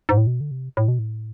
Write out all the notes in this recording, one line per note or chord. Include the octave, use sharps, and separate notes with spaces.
G#2
A2
B2
D3
C3
A2
B2
A2